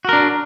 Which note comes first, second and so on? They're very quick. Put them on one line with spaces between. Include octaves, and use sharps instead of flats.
F#4 A#4 D4